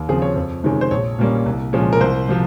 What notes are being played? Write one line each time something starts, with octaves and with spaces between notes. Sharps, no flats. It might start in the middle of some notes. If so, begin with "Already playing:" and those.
Already playing: D#2
C#3 F3 C4 G#4
C#5
F2
C3 D#3 G#3 C#4
C5
A#1 C#5
A#2 G3 A#3 C#4
C2
A#2 F3 G#3 C#4
A#4
C2 C5
C3 F3